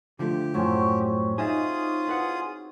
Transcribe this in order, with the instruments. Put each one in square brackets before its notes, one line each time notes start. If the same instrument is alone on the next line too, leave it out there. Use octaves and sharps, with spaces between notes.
[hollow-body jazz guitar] D3 F3 A3 [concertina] G4 [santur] A#5
[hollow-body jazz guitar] F#2 A2 F3 [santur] F#3 C4 C#4
[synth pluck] D#4 [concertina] F4 G#4 D#6 [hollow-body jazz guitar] E5 G#5
[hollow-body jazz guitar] E4 B4 F#5